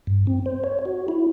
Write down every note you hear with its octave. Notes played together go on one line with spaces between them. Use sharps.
G2
C4
C5
C#5
F#4
E4